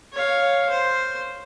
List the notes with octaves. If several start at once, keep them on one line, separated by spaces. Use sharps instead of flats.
C#5 F5
C5